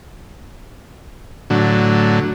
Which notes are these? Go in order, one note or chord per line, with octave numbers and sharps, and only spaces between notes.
A2 D3 F#3